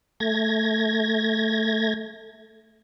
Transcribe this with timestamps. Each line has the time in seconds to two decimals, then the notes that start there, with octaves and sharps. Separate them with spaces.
0.20 A3 G#6 A#6